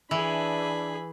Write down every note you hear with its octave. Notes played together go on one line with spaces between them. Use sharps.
E3 D4 G#4 B5